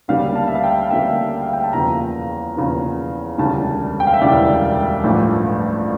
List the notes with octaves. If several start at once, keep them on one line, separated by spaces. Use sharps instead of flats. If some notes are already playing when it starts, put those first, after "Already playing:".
D2 C#3 G3 A#3 F5
A5
E5
F5
G5
D2 C#3 G3 A#3 E5
F5
G5
A5
E2 C#3 F3 A#3 A#5
E2 C#3 F3 A#3
E1 D2 C#3 E3 G3 A5
G5
F5
E5
E1 D2 C#3 E3 G3 D5
A1 G2 F3 A3